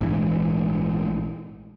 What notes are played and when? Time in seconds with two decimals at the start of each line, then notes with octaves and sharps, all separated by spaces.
0.01 A#1 G#2 E3